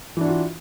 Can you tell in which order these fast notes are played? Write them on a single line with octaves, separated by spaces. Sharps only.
E3 D4 F#4 F4